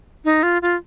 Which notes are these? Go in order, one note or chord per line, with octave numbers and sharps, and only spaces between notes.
D#4
F4
F4